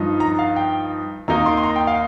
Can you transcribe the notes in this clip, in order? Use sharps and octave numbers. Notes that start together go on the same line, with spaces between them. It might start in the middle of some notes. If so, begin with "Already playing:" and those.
Already playing: G2 F3 D#4
A#5
F5
G5
D#2 D#3 A#3 D#4 A#5
C6
C6
A#5
G5
F5